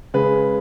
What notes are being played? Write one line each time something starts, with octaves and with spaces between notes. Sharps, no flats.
C#3 G#3 G#4 B4